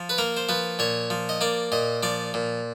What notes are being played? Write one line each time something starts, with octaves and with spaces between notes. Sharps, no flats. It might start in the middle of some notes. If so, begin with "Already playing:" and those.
Already playing: F3
B4
A#3 A#4
C5
F3 B4
A#2 C#5
F3
D#5
A#3 D5
A#2 D#5
F3 D5
A#2